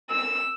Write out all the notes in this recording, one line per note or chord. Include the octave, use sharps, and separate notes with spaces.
E6